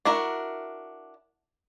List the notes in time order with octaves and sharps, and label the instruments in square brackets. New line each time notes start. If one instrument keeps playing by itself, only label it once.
[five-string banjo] D4 E4 F#4 A#4